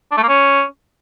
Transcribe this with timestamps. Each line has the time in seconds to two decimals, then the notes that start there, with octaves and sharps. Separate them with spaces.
0.11 D4
0.17 A3
0.23 A#3
0.28 C#4